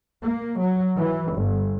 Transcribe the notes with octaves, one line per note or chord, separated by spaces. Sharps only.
A#3
F#3
E3
G1